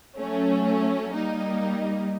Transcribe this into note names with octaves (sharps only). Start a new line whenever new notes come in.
F#3 A3 C#4
G3 A#3 D#4